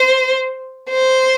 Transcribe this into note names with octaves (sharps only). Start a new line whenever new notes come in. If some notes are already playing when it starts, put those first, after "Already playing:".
Already playing: C5
C5